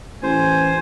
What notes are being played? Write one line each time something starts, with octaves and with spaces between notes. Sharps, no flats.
A1 C5 G#5